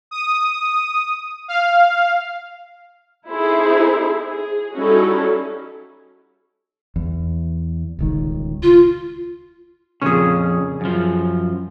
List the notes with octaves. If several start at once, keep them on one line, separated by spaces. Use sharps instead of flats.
D#6
F5
C4 D#4 E4 G#4 A4 C5
G#4
G3 C#4 D#4 E4 F#4 A4
E2
D#1 C#2 D#3
F4
F2 A#2 C#3 C#4 G#4
F#2 F3